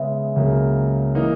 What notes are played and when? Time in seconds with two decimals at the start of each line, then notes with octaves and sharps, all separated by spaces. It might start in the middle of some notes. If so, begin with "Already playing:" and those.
Already playing: C#3 G#3 B3 E5
0.36 C#2 C#3 F#3 A#3
1.15 E3 A#3 D#4